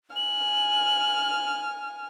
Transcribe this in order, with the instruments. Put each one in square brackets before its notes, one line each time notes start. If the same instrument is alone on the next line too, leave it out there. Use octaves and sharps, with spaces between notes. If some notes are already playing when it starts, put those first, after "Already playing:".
[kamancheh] G#5 F6 [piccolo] F#7